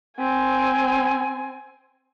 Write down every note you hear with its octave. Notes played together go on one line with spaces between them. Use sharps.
C4 G#5